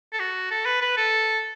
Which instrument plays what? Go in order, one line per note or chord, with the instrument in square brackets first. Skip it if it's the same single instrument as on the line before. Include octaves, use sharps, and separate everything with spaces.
[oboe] A4
F#4
A4
B4
B4
A4